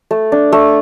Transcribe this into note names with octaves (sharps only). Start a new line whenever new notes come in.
A3
D4
A3